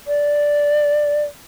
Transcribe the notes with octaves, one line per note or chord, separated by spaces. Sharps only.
D5